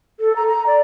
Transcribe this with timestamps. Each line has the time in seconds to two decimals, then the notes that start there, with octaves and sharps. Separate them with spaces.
0.20 A4
0.36 A#5
0.47 A#5
0.66 D5